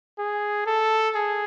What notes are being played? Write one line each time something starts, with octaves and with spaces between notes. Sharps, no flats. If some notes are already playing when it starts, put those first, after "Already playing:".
G#4
A4
G#4